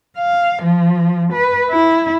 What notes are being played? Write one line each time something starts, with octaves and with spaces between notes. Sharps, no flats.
F5
F3
B4
E4